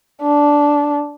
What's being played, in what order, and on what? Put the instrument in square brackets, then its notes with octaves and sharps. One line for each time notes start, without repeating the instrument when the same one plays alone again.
[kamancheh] D4